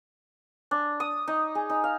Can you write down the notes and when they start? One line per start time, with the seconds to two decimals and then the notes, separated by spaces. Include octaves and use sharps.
0.71 D4
1.00 D#6
1.28 D#4
1.55 G#4
1.70 D#4
1.84 F5